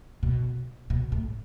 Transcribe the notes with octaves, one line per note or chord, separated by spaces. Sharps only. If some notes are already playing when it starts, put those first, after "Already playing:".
B2
B2
A2